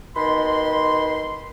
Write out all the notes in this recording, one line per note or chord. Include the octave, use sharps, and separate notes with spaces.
B2 D#3 B5 C6